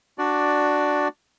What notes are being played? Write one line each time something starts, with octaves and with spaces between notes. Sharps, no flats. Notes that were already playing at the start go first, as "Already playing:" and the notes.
D4 F#4 D5